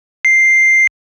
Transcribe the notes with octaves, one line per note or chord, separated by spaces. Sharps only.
C7